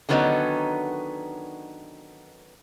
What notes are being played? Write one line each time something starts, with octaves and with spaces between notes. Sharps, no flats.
D3 D#3 F#3 B3 C#4 D#4